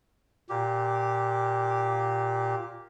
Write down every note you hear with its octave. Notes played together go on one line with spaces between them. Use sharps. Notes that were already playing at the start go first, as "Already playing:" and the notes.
A#2 G4